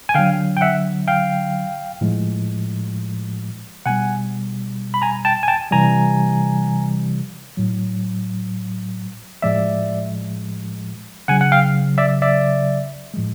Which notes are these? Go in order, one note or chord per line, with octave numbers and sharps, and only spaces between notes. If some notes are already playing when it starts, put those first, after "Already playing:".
G#5
D3 F#3 F5 G5
G5
E5 F#5
F5 G5
A2 F3 G#3
B2 G3 F#5 G#5
B5
G#5 A#5
G5 A5
G#5
G5 A5
C3 E3 G3 G#5 A#5
A2 F#3
A2 F3 G#3 D5 E5
C#3 F#3 F#5 G#5
F#5
F5 G5
D5 E5
D5 E5
A2 F3 G#3